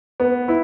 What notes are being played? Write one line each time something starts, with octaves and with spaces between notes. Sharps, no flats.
B3
E4